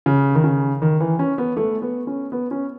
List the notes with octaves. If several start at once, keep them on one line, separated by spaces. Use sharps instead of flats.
C#3
D#3
C#3
D#3
E3
C#4
B3
A3
B3
C#4
B3
C#4